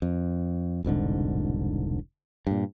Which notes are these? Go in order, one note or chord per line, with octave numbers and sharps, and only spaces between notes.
F2
E1 C2 G#2 D3
G2 A#2